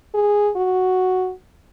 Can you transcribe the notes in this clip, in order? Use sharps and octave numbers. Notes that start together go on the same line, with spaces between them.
G#4
F#4